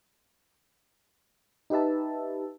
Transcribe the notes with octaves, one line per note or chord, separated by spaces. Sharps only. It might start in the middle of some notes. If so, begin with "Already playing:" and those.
D#4 G4 B4 E5 A5